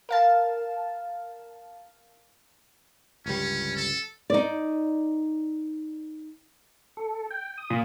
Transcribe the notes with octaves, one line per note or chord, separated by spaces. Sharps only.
A#4 F5 A5
G1 C#2 G3 C#4
A4
D#4 D5
A4
G5
D#6
A#2